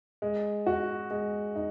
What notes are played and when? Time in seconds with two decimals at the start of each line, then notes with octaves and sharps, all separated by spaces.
0.22 G#3
0.66 F#4
1.11 G#3
1.56 D#4